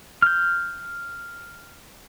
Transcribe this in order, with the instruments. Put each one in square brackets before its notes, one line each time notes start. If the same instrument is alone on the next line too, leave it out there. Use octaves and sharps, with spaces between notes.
[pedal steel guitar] F6 G6